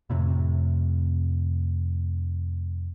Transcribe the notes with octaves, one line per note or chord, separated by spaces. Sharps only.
F2 A2 C3